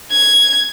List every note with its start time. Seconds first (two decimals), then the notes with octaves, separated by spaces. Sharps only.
0.11 G#6